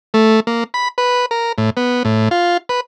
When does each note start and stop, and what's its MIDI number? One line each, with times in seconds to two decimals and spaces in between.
0.14 0.40 57
0.47 0.64 58
0.74 0.88 83
0.98 1.26 71
1.31 1.52 70
1.58 1.70 45
1.77 2.03 59
2.05 2.29 45
2.31 2.57 65
2.69 2.80 71